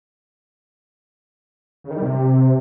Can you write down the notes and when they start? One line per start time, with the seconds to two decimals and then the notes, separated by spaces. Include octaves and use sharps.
1.84 C#3
1.90 D#3
1.96 G3
2.02 C3